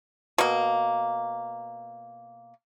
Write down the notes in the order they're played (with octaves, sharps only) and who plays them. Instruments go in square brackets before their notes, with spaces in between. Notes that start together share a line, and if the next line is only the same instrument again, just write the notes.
[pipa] B2 A#3